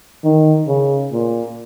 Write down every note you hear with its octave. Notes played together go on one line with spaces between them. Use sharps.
D#3
C#3
A#2